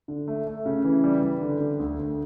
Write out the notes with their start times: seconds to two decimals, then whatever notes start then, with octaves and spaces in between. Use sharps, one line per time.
0.08 D3
0.28 A3
0.47 A3
0.66 C#3
0.84 E3
1.04 G3
1.22 G3
1.41 D3
1.60 D3
1.79 D2
1.99 D2